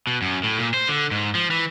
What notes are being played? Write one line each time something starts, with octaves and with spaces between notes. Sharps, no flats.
B2
F#2
A2
A#2
C5
D3
G#2
F3
E3